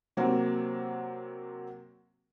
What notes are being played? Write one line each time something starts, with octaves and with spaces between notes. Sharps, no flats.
C3 F#3 A#3 C4